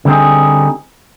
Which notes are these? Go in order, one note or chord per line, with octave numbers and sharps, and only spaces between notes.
D3 G3 C4 D#4 G#4